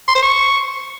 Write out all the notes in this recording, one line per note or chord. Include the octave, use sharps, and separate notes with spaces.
C6
C5
C#6